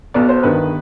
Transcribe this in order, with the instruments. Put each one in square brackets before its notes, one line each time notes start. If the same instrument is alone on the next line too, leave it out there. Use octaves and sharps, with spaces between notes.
[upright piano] B1 B2 B3 D5
C5
G1 G2 D#3 B4